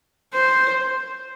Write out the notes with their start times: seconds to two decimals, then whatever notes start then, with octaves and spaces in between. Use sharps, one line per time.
0.34 C5